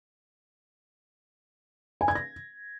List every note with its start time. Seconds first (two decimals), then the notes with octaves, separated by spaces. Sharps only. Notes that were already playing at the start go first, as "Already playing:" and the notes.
2.01 G#5
2.08 G#6
2.15 A#6